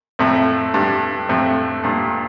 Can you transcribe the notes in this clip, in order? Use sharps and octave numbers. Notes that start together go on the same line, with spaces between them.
F2 A2
G2
F2 A2
G2 A#2